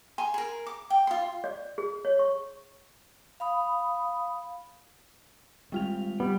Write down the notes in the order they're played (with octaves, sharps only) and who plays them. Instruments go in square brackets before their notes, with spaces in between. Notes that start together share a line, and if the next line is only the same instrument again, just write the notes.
[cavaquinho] G#5 A#5 C6
G#4 A#4
D6
G5
F4 C6
[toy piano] D5
G#4
C#5
C#6
[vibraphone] F5 B5 D#6
[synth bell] G3 F4 F7 [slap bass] G#3 C4
[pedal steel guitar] G3 [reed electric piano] B3